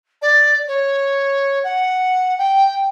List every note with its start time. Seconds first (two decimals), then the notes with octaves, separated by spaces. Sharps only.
0.21 D5
0.68 C#5
1.64 F#5
2.38 G5